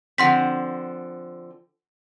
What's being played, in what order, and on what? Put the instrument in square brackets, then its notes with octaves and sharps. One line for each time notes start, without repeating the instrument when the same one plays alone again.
[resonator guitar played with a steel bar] D3 F3 C4 [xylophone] F#5 C6 B6